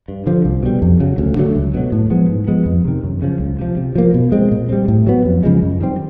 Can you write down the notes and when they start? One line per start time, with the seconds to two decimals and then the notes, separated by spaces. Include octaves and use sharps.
0.08 G2
0.27 D3 F3
0.45 C2
0.63 B2 G3
0.82 F2
1.00 C#3 F#3
1.18 D2
1.37 D3 F#3 A3
1.55 C#2
1.74 B2 F#3
1.92 A2
2.10 F3 G#3 B3
2.29 G#2
2.48 F3 G#3 B3
2.66 F2
2.85 C3 D#3
3.03 F#2
3.22 C#3 F3
3.40 C#2
3.59 C3 F3
3.77 C3
3.95 F3 A#3
4.14 B2
4.32 G#3 C4
4.51 A#2
4.69 G3 C4
4.88 A2
5.07 F#3 B3
5.25 F2
5.43 C#3 F3 G#3
5.62 F#2
5.80 D#3 G3 C4